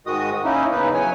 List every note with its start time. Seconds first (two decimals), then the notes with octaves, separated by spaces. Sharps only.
0.07 G#2 D#3 G#3 F#4 D#5 D#6
0.44 A#3 C#4 D#4 E4
0.71 E2 C#3 D#4 B4
0.94 F#3 C#5 G#5